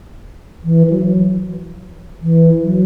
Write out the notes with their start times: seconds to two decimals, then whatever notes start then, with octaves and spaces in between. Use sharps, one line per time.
0.64 E3
0.90 F#3
2.22 E3
2.63 F#3